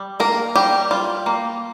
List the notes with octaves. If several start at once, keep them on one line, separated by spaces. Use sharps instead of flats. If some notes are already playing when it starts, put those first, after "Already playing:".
Already playing: G3
A#3 A#4
G3 G4
G3 F4
A#3